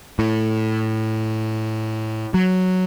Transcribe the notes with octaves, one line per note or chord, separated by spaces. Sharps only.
A2
F#3